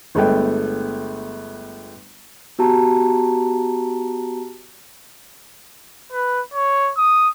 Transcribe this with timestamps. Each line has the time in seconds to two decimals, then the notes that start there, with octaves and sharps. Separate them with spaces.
0.15 G1 G#3 A3 B3 G5
2.59 B3 F#4 G4 A5 A#5
6.13 B4
6.54 C#5
6.98 D#6